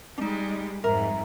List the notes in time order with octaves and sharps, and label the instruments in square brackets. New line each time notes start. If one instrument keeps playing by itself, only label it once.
[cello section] G3 G#3 [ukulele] D4 D#4
[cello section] F2 G#2 [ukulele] A#4 [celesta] E5 A#5